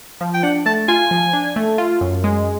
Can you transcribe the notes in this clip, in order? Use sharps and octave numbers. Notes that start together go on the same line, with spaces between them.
F3
G5
D4 F#5
A3 A5
F4 G#5
F3
D4
A3
F4
F#2
G#3